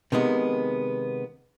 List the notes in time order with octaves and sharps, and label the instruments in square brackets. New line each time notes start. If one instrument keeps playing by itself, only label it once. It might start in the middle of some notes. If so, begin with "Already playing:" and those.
[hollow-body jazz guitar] C3 D#3 G#3 B3